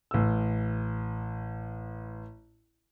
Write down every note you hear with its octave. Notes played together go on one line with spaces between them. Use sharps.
A1 E6